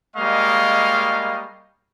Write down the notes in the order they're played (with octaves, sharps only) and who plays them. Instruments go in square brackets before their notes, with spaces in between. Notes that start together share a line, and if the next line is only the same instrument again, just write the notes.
[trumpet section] G3 G#3 A#3 D#5 F5 C#6